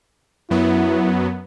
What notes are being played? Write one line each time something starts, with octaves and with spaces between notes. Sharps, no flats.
F#2 F#3 B3 E4